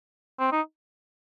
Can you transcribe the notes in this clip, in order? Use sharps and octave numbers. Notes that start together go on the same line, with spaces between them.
C4
D#4